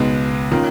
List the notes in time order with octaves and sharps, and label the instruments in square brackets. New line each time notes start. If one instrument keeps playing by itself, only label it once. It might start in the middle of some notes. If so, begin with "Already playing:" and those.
Already playing: [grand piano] C#2 B2 G#3 [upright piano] B3 D#4
[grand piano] D#3 A#3 [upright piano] C#4 F4